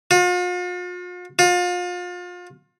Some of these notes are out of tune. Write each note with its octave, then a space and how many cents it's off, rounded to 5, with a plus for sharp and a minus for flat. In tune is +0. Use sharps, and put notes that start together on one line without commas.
F4 +45
F4 +35